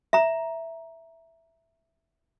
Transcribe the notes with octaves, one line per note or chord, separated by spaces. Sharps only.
E5 A#5